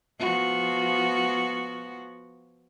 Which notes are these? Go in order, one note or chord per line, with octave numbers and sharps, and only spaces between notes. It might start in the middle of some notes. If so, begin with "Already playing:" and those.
F3 B3 F#4